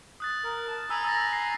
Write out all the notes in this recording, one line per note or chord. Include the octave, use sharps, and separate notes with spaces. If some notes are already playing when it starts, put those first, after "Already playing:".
D#6 F#6 A6
A#4
A5
G#5 A#5 B5 E6
E6 A6 A#6
C7